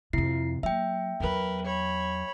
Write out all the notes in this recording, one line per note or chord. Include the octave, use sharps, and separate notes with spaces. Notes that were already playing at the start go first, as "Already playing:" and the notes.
F2 C3 E4 C7
F#3 A#3 E5 G5
E2 F#3 A#4 B4
C#5 B5